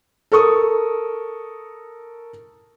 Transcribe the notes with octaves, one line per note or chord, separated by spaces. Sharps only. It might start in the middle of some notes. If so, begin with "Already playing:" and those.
A4 A#4 C#6 D#6